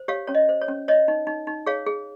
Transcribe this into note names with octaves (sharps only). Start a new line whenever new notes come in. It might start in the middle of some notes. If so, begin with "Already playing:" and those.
Already playing: C5
G4 C#5 F5
C#4 C#5
D#5
C5
C#5
C#4
C#5 D#5
D#4
D#4
D#4
G#4 C#5 F5
G#4